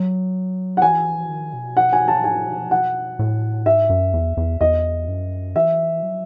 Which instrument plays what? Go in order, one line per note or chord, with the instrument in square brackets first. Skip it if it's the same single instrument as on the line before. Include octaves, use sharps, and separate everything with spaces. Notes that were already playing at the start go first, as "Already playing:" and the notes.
Already playing: [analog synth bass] F#3
[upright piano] F#5
[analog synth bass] E3 [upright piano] G#5
[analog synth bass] D#3
B2
[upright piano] F#5
G#5
A5
[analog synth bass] A2 [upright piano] G#5
[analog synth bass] B2
[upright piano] F#5
[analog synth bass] A2
[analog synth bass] G#2 [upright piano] E5
[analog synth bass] F#2
E2
E2
[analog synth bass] E2 [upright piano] D#5
[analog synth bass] F#2
[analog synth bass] E3 [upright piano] E5
[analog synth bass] F#3